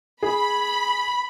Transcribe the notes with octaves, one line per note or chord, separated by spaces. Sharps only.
G#4 B5